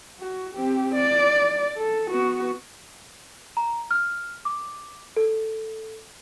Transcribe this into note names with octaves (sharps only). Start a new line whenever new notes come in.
F#4
C4 G4
D5
A4
B3 F#4
A#5
F6
D6
A4